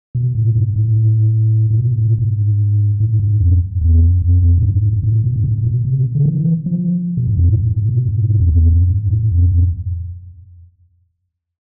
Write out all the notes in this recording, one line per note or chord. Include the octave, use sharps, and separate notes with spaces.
B2
A2
G#2
A2
A2
B2
A2
G#2
A2
G#2
F2
E2
F2
F2
F2
A2
G#2
G#2
A2
B2
G#2
A2
A2
B2
C3
D3
E3
F3
B2
G#2
F2
A2
A2
G#2
B2
G#2
G#2
F2
E2
F2
G#2
A2
F2
F2